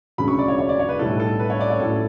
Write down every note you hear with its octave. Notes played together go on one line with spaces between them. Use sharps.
E1 D2 C#3 F#3 C#4 B5
C#6
D5
C#5
C#5
D5
C#5
B4
B1 A2 G3 B3 E4 A4
A4
B4
C#5
D5
C#5
A2 F#3 C#4 E4 A4